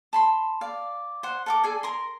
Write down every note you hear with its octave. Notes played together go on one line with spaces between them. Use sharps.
A5 B5 C6
D5 F5
C5 F#5
A4 A#4 D6
G#4 A4 D5 G#5
A#4 A#5 C6